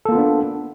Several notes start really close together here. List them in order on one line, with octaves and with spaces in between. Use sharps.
A4 A#3 F4 B3 D4